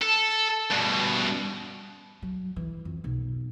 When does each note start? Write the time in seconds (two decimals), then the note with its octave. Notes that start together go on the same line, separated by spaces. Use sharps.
0.02 A4
0.70 G2 B2
2.22 F#3
2.56 E3
2.85 F2
3.04 B1